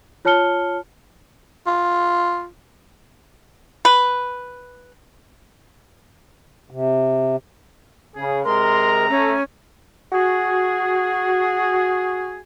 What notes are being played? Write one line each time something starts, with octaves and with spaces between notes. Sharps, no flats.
F4 C#5 A5 F6 C#7 G7
F4
B4
C3
C#3 G#4
C3 G#3 A#4 A#5 C6
A3 C#4
F#4 G#4